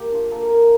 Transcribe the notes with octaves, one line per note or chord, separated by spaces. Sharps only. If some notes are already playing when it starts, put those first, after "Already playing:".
Already playing: A#3 G4
D4 F4
A#3 A4
A#4
D4 F4